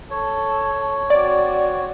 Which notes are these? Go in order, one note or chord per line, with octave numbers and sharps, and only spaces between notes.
A4 C#5
C4 F#4 D5